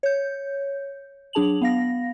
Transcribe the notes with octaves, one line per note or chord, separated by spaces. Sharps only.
C#5 G6
F#3 D4 G#4 A5 F7 F#7
B3 F5 A#6